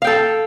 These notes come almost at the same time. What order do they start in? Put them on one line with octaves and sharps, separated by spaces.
F5 G5 A4